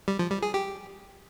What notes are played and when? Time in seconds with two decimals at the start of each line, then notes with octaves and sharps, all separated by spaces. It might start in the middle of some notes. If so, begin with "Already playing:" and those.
0.08 G3
0.19 F3
0.31 G3
0.42 G#4
0.54 G4